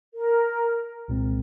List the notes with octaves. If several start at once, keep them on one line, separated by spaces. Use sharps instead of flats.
A#4
C2 A#2 G#3 C4